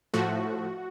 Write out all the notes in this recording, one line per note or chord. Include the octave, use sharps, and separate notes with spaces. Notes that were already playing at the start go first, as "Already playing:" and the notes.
A2 F3 A3 F#4